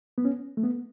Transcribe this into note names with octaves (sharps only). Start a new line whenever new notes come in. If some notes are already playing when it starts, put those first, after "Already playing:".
B3
C#4
A3
B3